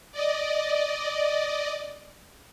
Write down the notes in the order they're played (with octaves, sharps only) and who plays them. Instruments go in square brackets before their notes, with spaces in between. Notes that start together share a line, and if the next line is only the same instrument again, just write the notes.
[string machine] D5 D#5